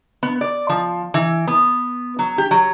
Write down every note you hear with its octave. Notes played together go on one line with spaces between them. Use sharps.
B3
D5
F3
E3
B3
F#3
G4
F#3